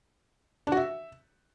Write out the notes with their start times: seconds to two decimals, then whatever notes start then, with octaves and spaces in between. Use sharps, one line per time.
0.67 D4
0.72 F#4
0.77 E5